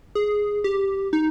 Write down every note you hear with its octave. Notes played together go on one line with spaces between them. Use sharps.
G#4
G4
D#4